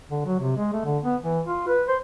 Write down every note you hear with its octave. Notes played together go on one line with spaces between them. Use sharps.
D3
F#3
C3
G#3
A3
D3
B3
E3
F4
B4
C5